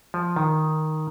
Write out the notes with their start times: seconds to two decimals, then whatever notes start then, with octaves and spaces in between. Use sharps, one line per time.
0.14 F3
0.36 D#3